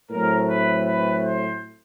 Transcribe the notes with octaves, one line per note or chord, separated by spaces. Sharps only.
A2 F#3 A3 C4 A#4
B4
B4
C5